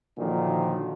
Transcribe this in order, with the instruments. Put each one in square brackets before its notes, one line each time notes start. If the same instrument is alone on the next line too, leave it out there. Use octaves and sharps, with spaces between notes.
[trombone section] A#2 D3 D#3 F3 F#3